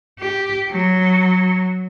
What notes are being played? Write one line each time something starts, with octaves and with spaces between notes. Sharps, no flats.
G4
F#3